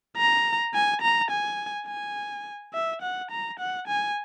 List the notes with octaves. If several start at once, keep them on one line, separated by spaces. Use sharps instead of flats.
A#5
G#5
A#5
G#5
G#5
E5
F#5
A#5
F#5
G#5